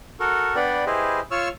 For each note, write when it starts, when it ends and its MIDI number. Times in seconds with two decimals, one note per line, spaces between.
0.20 0.55 66
0.20 0.55 69
0.20 0.55 70
0.56 0.85 59
0.56 0.85 62
0.56 0.85 71
0.56 0.85 74
0.56 0.85 78
0.56 0.85 79
0.86 1.20 64
0.86 1.20 67
0.86 1.20 68
0.86 1.20 71
0.86 1.20 72
0.86 1.20 75
1.31 1.49 65
1.31 1.49 73
1.31 1.49 85
1.31 1.49 88
1.31 1.49 89